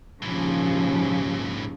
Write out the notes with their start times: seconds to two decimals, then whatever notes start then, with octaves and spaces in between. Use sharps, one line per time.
0.23 A#1 D#2 G#2 C#3 E3 F3